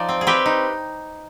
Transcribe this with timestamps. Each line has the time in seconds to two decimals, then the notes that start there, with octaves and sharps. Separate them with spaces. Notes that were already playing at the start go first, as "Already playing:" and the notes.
Already playing: F3 D#4 D5
0.09 C4
0.21 G#4
0.27 C4 G4 B4
0.46 D#4